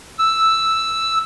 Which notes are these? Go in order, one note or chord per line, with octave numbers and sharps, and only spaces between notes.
E6